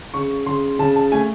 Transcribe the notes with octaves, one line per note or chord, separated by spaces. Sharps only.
C#3 C#6
C#3 C6
C#3 A5
A5
A3 G#5